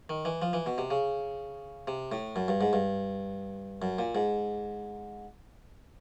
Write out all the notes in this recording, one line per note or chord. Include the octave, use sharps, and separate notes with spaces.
D#3
E3
F3
E3
B2
C3
C#3
C3
A2
F#2
G2
G#2
G2
F#2
A#2
G#2